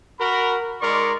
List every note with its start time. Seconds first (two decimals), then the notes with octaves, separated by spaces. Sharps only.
0.20 F#4 A#4 B5
0.81 G#3 D#4 A#4 D5 C6 C#6